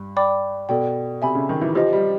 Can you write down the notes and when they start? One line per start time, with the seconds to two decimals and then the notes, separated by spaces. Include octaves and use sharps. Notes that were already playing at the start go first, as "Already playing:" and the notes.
Already playing: G2
0.16 D5 G5 B5 D6
0.69 B2 A4 D5 G5
1.22 C3 E5 G#5 B5
1.35 C#3
1.49 D#3
1.61 E3
1.75 F3 G4 C5 D#5
1.93 G3